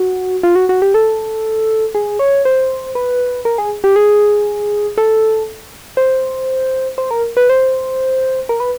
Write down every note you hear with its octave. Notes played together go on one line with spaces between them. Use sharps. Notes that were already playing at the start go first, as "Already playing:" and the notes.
Already playing: F#4
F4
F#4
F#4
G4
A4
G#4
C#5
C5
B4
A#4
G#4
G4
G#4
A4
C5
C5
A#4
B4
C5
A#4
B4